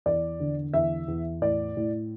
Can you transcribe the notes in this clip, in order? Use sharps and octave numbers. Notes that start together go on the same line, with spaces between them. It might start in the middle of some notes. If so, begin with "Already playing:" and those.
E2 D5
D3
E2 E5
E2
A2 D5
A2